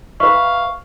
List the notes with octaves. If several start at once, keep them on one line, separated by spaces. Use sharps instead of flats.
B4 E5 F5 C#6